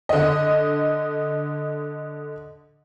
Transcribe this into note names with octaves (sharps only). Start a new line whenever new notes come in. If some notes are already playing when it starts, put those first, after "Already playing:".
D3 D#5